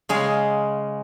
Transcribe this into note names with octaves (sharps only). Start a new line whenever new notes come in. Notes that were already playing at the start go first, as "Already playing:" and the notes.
C#3 G#3 G#4 F5